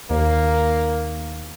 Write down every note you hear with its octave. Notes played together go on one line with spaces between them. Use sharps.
D#2 A#3